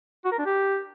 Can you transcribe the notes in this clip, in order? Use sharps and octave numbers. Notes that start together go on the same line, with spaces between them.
F#4
A#4
D4
G4